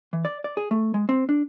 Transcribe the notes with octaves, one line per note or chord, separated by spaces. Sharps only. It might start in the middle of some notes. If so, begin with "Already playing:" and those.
E3
D5
D5
G#4
A3
G#3
C4
D4